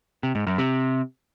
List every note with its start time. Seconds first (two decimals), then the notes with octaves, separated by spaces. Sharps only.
0.23 C3
0.35 G#2
0.47 F#2
0.58 C3